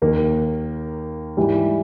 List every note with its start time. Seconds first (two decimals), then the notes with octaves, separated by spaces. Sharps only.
0.02 D#2 D#3 A#3
1.37 G#2 E3 G3